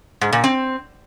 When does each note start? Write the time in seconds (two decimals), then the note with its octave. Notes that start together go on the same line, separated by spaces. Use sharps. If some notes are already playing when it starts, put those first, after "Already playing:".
0.21 G#2
0.33 A#2
0.44 C4